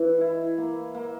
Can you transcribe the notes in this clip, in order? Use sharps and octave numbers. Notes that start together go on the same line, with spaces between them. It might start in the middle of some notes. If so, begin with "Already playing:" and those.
Already playing: E3
E4
A#3
A#3